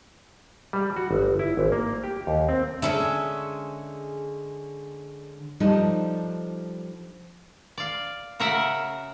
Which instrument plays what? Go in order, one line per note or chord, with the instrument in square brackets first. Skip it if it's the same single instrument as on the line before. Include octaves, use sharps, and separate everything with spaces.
[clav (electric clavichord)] G3
F#4
G1
E4
G#1
A#3
G4
D#2
C4
[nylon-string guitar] D3 A5 [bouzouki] G#3 C#4 E5
[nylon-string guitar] F3 G3 D4 D#4 A4
[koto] D5 F5
C#3 F#4 A#4 E5 F#5